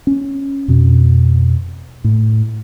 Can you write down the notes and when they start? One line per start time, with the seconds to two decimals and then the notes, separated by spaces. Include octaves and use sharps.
0.07 C#4
0.68 F2 B2
2.04 A2